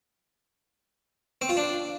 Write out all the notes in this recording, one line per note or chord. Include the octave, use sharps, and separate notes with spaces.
C4
F4
D4